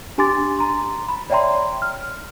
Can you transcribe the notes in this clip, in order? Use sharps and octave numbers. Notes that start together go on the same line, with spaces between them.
D4 G4 G#5 C6 D6 A6
A#5 C6
B5
C#5 D5 E5 G5 A#5 C6
F6